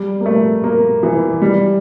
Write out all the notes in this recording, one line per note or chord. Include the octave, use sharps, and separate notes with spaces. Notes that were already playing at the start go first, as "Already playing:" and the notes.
Already playing: G3
A#3
A3
A#3
E3
G3